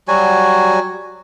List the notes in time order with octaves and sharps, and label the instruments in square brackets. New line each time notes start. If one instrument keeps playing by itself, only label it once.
[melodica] F#3 G3 F#4 G#5